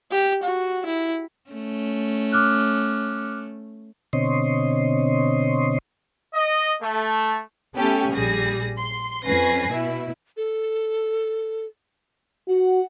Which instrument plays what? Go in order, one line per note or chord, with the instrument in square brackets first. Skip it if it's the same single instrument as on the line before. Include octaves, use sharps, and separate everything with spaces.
[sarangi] G4
F#4
E4
[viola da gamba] A3 C#4
[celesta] D6 F6 F#6
[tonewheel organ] B2 D3 C4 C#5 D#5 C6
[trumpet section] D#5
A3
[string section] A3 B3 C#4 G4 A4
A#1 G3 G#4 A#6
C6
F2 C#4 B4 G#5 A#6 C7
B2 E4
[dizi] A4
[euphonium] F#4 [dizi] F#5